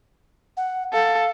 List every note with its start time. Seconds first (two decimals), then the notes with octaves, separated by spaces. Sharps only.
0.57 F#5
0.93 A4 F5